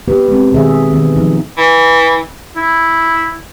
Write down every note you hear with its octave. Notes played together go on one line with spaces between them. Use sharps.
G3 B3 G4 B4
G#3 C4
B2 D#3 G#4 E5
D#3 E3 B3
F3 F#3 D#4
E3
E4